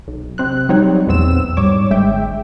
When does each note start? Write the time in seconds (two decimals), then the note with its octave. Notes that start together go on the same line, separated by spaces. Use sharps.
0.07 B1
0.38 C3 C4 F#6
0.69 F#3 G3 C4 D#4 C#5
1.07 A#1 E2 B3 C4 E6 E7
1.57 G#2 G3 C#5 D6
1.91 G1 G#3 E5 G5